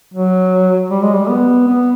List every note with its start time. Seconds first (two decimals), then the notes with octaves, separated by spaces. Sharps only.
0.14 F#3
0.90 G3
1.03 G#3
1.13 G3
1.29 B3
1.67 B3